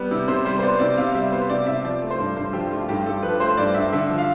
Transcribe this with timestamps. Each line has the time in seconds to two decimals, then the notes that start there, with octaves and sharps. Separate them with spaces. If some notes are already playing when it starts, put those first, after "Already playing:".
Already playing: G3 B3
0.11 C3
0.27 C3 C5
0.45 G3 C5
0.59 C5
0.63 B3 D5
0.80 C3 D5
0.97 C3 F5
1.15 G3 E5
1.32 B3 C5
1.50 C3 D5
1.66 C3 E5
1.84 F3 D5
2.02 A3
2.10 C5
2.19 G2
2.36 G2 C5
2.53 F3 G4
2.71 A3 F4
2.88 G2 G4
3.05 G2 A4
3.23 F3 B4
3.40 A3 C5
3.57 G2 D5
3.74 G2 E5
3.93 D3 E5
4.10 F3
4.18 F5